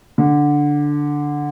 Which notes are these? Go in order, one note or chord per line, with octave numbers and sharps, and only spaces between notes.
D3